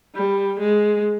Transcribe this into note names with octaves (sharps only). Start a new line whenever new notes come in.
G3
G#3